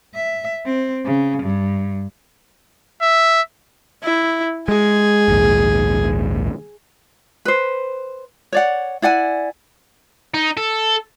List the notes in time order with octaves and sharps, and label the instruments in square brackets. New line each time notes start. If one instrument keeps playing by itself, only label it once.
[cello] E5
C4
C#3
G2
[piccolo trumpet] E5
[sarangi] E4
[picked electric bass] G#3 [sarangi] G#4
[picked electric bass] A#1 D#2 G#2
[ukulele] B4 C5
C#5 D5 F#5
E4 D5 F#5 G#5
[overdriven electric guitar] D#4
A4